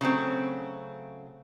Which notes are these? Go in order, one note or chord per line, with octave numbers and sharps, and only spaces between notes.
C#3 F#3 A3 C4